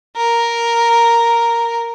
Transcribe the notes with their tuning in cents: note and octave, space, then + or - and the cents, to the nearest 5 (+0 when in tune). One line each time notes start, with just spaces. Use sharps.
A#4 +0